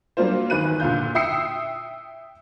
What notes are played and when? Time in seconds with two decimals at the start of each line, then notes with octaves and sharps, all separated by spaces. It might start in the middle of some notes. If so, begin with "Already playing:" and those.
0.17 F#3 G3 A#3 D4 F4 C5
0.50 E2 D#3 B4 F#6 D#7
0.80 A#2 D3 F5 G6
1.15 E5 G5 D#6 E6 C7 C#7